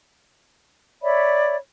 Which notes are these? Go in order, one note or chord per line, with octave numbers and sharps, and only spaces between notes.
C#5 D5 E5 B5